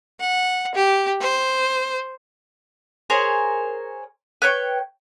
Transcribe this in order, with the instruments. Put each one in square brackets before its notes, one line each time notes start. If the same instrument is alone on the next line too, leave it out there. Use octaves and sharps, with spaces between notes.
[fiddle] F#5
G4
C5
[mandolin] G#4 A#4 C5 C#5
B4 C#5 G5 C#6